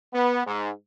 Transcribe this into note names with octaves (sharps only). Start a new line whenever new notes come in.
B3
G#2